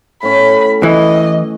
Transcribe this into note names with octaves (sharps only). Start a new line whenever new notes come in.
A2 C#4 B5
E3 D#5